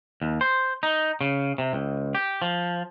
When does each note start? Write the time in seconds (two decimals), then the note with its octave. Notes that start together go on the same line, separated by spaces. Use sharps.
0.22 D#2
0.41 C5
0.83 D#4
1.21 C#3
1.58 C3
1.73 C#2
2.15 G4
2.42 F3